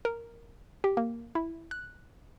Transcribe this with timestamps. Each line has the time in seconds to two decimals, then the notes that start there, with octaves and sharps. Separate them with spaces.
0.05 A#4
0.84 G4
0.97 A#3
1.35 E4
1.71 F#6